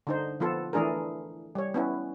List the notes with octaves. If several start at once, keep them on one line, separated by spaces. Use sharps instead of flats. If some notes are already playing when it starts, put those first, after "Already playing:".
D3 D#4 C5
F3 B3 F4 A4
E3 A3 D4 G#4 A#4
G3 C#5
B3 C#4 E4